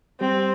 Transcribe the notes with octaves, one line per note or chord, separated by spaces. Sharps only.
G3 C4 G4